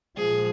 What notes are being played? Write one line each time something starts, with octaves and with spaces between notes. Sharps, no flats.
A#2 F3 G#3 G#4